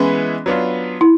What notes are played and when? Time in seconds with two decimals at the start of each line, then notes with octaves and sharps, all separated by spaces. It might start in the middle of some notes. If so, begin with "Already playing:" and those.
Already playing: E3 G#3 B3 C#4 E4
0.46 F#3 B3 D4 F4
1.01 E4